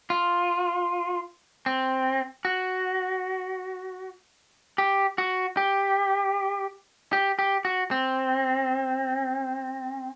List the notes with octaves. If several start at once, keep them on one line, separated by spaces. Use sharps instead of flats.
F4
C4
F#4
G4
F#4
G4
G4
G4
F#4
C4